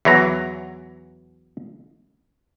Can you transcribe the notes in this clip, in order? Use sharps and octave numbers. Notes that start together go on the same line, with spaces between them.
E2 E3 F#3 A#5